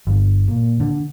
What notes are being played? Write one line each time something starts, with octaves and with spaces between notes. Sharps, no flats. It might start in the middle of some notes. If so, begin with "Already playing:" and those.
G1
A#2
D3